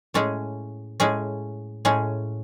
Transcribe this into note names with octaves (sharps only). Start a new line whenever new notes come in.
A2 G#3 C#4 G#4
A2 G#3 C#4 G#4
A2 G#3 C#4 G#4